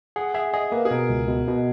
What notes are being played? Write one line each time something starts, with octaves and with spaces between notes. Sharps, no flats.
G#4 F#5
G#4 E5
G#4 D#5
A#3 B4
G#4
B2 A#4
C#2
B2
B2